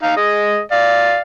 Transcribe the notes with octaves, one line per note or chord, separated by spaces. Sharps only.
D#4 F5
G#3 D#5
D5 F5